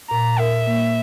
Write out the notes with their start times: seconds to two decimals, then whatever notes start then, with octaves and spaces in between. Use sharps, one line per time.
0.10 A#2 A#5
0.39 A#4 E5
0.67 A#3